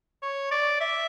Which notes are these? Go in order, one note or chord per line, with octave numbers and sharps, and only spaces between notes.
C#5
D5
E5